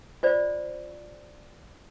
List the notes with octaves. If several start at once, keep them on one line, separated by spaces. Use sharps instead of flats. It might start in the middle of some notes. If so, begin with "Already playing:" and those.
F4 C5 D5